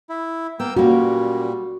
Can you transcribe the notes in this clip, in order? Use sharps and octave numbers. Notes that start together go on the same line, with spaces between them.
E4
A#3 B3 G5 E6
A#2 G3 A#3 C#4 F#4